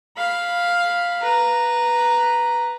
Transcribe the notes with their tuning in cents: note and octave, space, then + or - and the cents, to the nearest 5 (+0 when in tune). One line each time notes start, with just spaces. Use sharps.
F5 +0 B5 -5
B4 -5 A#5 +0